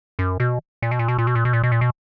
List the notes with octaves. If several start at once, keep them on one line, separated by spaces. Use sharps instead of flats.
F#2
B2
A#2
B2
A#2
B2
A#2
B2
A#2
B2
A#2
B2
A#2
B2